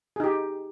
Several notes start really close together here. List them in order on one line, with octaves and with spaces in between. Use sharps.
G#4 D#4 G4